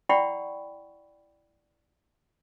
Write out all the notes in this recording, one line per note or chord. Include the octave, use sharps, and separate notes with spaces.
E4 D5 F#5 G5 B5 C#6